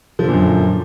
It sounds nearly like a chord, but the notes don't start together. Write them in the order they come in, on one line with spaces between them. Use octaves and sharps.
F3 D3 A#2 F#2